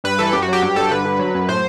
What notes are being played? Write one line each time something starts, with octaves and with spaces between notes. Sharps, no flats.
G2 B4
E3 A4
F#2 G4
F#4
F#3 G4
G2 G4
G2 A4
D3 B4
D3
F#3
F#2
A2 C5